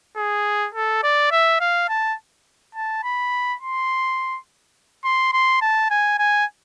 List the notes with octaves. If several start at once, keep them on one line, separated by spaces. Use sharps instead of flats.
G#4
A4
D5
E5
F5
A5
A5
B5
C6
C6
C6
A5
G#5
G#5